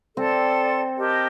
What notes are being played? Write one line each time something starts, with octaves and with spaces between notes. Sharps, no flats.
C4 A4 D5 A5 C6
G4 A#4 D#5 A5